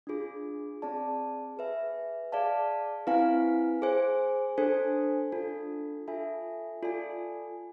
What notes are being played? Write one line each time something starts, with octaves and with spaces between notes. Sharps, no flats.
D4 F4 G#4
C4 G#4 D5 A5
G#4 B4 E5 G#5
G#4 D5 F5 A5
C4 E4 B4 F5 G#5
G#4 C5 G#5
D4 A4 C5 G#5
D4 F4 A4
F4 A4 E5 G#5
F4 A4 D5 G#5